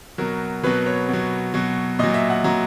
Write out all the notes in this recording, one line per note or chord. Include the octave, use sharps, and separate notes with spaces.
B2 F#3 A#4
B2 F#3 B4
C#5
B2 F#3
B2 F#3
A#2 F#3 D#5
E5
F#5
A#2 F#3 A#5